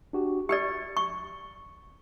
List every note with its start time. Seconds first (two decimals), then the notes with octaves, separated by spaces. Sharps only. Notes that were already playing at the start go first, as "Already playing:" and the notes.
0.13 D4 F#4 G4
0.49 G4 B4 D5 A6 C#7
0.97 C#6